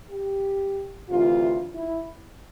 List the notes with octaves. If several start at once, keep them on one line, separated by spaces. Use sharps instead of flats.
G4
D2 C3 E3 F4
E4